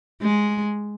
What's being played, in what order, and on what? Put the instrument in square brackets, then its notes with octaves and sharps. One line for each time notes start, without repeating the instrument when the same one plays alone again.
[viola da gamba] G#3